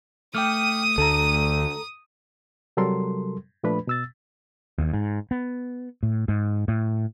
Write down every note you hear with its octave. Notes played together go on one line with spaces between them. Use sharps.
A3 G5 D6 D#6 F6 D#7
D2 A4 A#5
C3 F#3 G3 A4 A#4 C6
A#2 F3 A3 D4 B4 B5
B2 E6 A6
D#2
G#2
B3
A2
G#2
A2